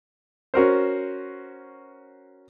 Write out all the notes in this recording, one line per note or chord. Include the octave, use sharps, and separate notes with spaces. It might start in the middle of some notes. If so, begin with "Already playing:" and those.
C#4 F#4 A#4 C5